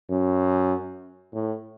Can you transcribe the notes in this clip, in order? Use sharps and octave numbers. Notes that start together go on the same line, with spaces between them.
F#2
A2